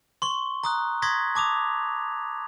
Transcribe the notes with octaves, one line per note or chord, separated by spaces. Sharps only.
C6 C#6 G7
A#5 D#6 F#6
C6 C#6 D#6 G#6 A#6 B6
A5 D6 D#6 F7